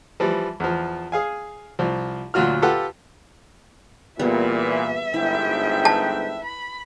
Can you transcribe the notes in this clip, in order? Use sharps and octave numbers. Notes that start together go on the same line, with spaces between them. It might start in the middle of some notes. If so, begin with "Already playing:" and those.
E3 F3 G3
E2 F3
G#4 F5 G#5
C2 F3
D2 A#2 F#3 F4 F#4 F6
F4 G4 A4 B4 F#5 E6
A#2 E3 G3 B3 G#4 E5
G1 G#2 E4 G5
B4 A5
B5